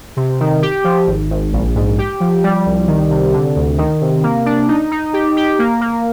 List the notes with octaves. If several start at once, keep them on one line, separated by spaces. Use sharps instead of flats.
C3
D#3
G4
F3
G#1
G#1
A#1
G#2
G4
F3
G3
C2
D#3
C3
D3
D2
D#3
C3
A#3
D4
D#4
D#4
G4
G4
A#3
A#3